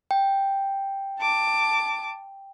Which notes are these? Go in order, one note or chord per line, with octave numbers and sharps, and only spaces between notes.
G5
A5 D6